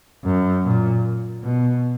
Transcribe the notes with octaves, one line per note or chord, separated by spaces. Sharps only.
F#2
A#2
B2